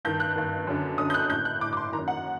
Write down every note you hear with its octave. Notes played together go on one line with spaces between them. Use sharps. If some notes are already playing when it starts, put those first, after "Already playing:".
G2 D#3 G6
F#6
G2 D#3
F#2 D3
F#2 D3 D#6
G6
F#6
A2 G6
F#6
A2 D6
D6
C6
F#2 D#3 A#5
F#5